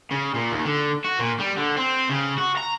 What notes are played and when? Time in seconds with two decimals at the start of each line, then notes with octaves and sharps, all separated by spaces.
0.11 C#3
0.35 A#2
0.52 D#2
0.65 D3
1.05 F#4
1.20 A#2
1.39 G3
1.57 D3
1.77 C4
2.09 C#3
2.38 F#4
2.57 A#5